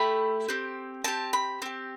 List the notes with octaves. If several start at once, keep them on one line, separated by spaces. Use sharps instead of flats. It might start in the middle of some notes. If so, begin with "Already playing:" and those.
Already playing: A3 E4 G4 B5
C4 G4
C4 G4 A5
B5
C4 G4